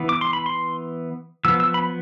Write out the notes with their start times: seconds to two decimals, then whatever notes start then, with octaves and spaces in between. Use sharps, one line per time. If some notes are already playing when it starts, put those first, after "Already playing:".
Already playing: E3 B3
0.09 D6
0.21 C6
0.33 B5
0.46 C6
1.45 F3 B3 E6
1.60 E6
1.74 B5